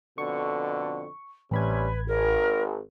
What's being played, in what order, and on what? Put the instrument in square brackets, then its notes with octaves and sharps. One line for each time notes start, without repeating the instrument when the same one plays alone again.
[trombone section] F2 B2 D3 [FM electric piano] C#6
[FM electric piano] A1 B5 G#6 [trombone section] C3 G3 C#4 [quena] B4
[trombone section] G#1 [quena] A#4